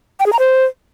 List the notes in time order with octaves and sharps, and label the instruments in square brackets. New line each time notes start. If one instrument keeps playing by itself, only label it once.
[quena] G5
G#4
A#5
C5